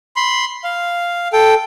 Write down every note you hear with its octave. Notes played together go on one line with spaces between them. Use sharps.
B5 C6
F5
A4 G5